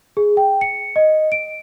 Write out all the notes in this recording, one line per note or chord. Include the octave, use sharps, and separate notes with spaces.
G#4
G5
C#7
D#5
D7